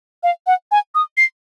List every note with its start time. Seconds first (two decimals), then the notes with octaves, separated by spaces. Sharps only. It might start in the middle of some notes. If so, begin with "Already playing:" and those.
0.23 F5
0.47 F#5
0.71 G#5
0.95 D#6
1.17 C7